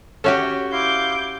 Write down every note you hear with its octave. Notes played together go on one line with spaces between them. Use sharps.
C#4 F#4 G4 A4 C#5 E5
E4 F5 C6 D6 G6